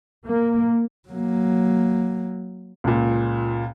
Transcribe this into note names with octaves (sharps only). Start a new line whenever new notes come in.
A#3
F#3 A#3
C#2 A#2